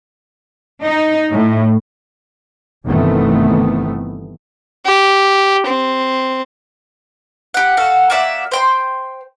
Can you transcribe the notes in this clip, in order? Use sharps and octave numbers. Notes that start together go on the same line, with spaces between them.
D#4
A2
G1 C3 D#3 E3 A3 B3
G4
C4
G4 F#5
F#4 A4 F5 F#5
A#3 F#4 D5 E5
C5 G5 C6